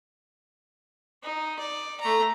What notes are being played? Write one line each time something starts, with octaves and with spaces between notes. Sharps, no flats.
D#4
D5
A3 A#5